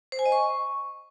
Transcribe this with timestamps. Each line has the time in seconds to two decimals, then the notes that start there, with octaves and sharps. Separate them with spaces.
0.12 C5
0.19 G#5
0.25 D#5
0.32 C#6